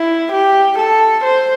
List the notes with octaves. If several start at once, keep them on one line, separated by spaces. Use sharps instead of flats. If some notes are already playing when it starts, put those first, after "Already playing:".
Already playing: E4
G4
A4
C5